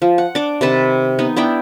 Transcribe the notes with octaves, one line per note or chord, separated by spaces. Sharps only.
F3
F#5
D4 D6
C3 D#3 B4 A5
B3 D#4
B3 D4 E4 G5